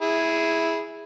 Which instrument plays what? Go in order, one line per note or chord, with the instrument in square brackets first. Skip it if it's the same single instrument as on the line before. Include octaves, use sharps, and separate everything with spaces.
[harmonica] E4 G#4